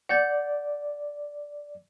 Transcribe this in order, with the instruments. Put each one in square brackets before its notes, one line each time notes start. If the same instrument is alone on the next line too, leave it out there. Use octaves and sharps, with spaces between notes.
[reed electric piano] D5 [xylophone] F#5 G6 A6